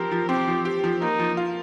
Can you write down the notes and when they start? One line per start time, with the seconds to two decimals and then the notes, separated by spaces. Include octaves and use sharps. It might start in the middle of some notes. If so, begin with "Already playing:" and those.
Already playing: F3 C4 G4 A#4
0.11 F3
0.29 C4 G4
0.48 F3
0.65 G4
0.84 F3
1.01 A#3 D#4
1.19 F3
1.37 F4